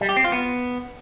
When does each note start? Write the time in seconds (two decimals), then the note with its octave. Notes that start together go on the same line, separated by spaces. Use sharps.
0.01 G3
0.09 G4
0.17 C4
0.24 F4
0.32 B3